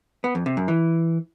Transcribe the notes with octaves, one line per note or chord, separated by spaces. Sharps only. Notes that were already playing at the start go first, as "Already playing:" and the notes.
B3
F2
C3
F#2
E3